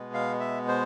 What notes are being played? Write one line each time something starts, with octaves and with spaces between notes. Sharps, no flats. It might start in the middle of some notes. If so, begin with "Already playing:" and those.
Already playing: B2 G#3 B3
F5
E5
C5